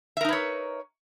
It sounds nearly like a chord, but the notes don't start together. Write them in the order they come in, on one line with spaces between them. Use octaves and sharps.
E5 A#4 D#4 B4 C#5